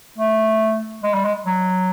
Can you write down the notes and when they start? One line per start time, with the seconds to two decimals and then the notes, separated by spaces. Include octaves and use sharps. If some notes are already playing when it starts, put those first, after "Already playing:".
0.18 A3
1.03 G#3
1.14 G3
1.25 G#3
1.46 F#3